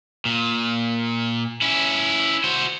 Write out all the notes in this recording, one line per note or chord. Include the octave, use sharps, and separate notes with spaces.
A#2
C#4 E4
F#4 C5